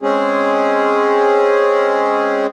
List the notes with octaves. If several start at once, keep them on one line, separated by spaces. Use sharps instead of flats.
G#3 C4 C#4 G#4